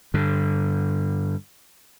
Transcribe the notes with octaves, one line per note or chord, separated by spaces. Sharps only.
G2 D3